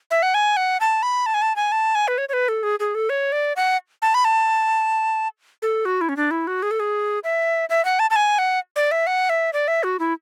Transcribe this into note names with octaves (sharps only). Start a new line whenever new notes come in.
E5
F#5
G#5
F#5
A5
B5
A5
G#5
A5
G#5
A5
G#5
B4
C#5
C#5
B4
A4
G#4
G#4
A4
C#5
D5
F#5
A5
B5
A5
A4
F#4
E4
C#4
D4
E4
F#4
G#4
A4
G#4
E5
E5
F#5
A5
A5
G#5
F#5
D5
E5
F#5
E5
D5
E5
F#4
E4